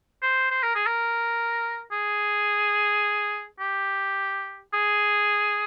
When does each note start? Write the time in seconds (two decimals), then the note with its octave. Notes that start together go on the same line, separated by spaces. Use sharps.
0.22 C5
0.51 C5
0.63 A#4
0.75 G#4
0.87 A#4
1.92 G#4
3.60 G4
4.74 G#4